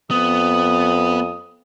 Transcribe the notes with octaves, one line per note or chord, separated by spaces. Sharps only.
F2 B3 D#6